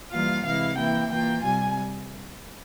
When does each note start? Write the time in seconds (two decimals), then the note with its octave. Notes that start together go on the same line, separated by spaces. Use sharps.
0.10 E3 G3 A#3 F4 F5
0.44 C3 E3 G#3 E4 F5
0.77 E3 A#3 E4 G5
1.11 E3 A#3 F4 G5
1.43 C3 G3 G#5